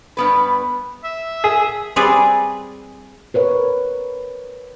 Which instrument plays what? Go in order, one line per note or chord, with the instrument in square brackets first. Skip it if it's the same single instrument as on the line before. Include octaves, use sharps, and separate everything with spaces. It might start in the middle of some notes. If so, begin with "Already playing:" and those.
[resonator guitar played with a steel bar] G2 B3 B4
[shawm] E5
[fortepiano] G#4
[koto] G3 C4 G#4 B4 D5
[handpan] A#4 B4 C#5